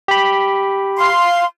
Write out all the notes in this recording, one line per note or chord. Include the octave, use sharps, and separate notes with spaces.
G4 B5
F5 C6